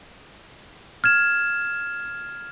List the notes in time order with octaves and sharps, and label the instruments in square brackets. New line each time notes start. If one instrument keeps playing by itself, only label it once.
[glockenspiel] F6 G#6 E7